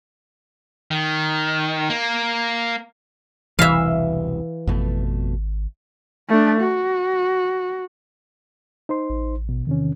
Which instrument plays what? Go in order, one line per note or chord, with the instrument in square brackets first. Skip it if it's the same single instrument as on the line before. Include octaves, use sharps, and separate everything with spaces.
[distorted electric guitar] D#3
A#3
[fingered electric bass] E1 C2 [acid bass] E3 [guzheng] E5 F5
[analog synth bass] G#1 [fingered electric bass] F2 B2 A3
[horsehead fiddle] A3 D4
F#4
[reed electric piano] D#4 C5 C6
[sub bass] A1
[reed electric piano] B2
[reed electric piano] E2 C3 C#4 [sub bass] D#3